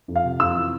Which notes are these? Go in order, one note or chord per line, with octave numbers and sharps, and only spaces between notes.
F2
F5
C3
F2 E6
E3